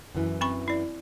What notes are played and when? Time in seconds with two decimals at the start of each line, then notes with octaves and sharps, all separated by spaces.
0.15 F#2 E3
0.41 C4 B5 C#6
0.68 E4 D5